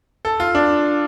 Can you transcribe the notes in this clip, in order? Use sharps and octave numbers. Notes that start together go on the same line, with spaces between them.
A4
F4
D4